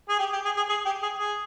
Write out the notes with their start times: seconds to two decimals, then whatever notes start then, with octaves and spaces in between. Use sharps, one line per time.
0.09 G#4
0.19 G4
0.33 G4
0.45 G#4
0.57 G#4
0.69 G#4
0.86 G4
1.03 G#4
1.18 G#4